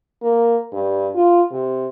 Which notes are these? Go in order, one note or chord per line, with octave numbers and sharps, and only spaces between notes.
A#3
G2
F4
C3